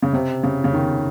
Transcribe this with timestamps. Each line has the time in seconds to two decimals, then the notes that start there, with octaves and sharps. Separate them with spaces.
0.02 C#3
0.13 C3
0.43 C#3
0.64 C#3
0.73 D#3